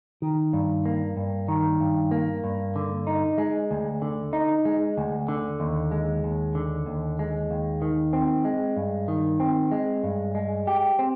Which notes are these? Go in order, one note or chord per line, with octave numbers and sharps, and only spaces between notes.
D#3
G2
A#3
G2
D#3
G2
A#3
G2
D3
D#4
G#3
D2
D3
D#4
G#3
D2
D3
D#2
G#3
D#2
D3
D#2
G#3
D#2
D#3
C4
G#3
G2
D#3
C4
G#3
G2
G#3
G4
C4